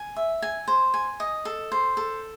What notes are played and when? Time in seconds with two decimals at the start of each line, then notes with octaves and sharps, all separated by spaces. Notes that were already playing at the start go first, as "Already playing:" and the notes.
Already playing: G#5
0.16 E5
0.42 G#5
0.68 C5
0.94 G#5
1.20 D#5
1.45 A4
1.72 C5
1.97 A4